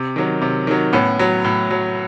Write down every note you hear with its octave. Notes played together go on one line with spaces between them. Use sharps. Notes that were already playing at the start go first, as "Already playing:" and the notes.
Already playing: C3
D#3 F#3
C3
D#3 F#3
A2 B3 C#4
F#3
A2
F#3